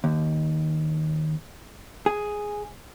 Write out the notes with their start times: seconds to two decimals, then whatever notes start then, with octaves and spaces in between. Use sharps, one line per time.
0.04 D#2
2.06 G#4